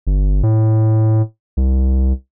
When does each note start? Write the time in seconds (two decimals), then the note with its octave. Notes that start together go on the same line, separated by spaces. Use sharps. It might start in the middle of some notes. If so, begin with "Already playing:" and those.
0.07 G1
0.43 A2
1.57 C2